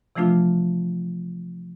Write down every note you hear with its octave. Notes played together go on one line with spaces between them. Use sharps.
C3 E3 F3 A3 D4 F4